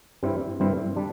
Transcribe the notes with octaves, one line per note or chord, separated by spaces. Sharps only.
G2 G3 C4 E4
G2 G3 C4 E4
G3 D4